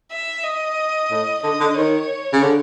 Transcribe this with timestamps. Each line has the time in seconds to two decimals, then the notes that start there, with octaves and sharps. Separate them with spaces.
0.12 E5
0.44 D#5
1.11 A2
1.43 D3 D#5
1.60 D3
1.77 D#3 C#5
2.33 C#3
2.42 D3